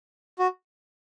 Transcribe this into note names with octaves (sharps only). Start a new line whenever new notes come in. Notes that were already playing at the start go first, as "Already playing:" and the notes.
F#4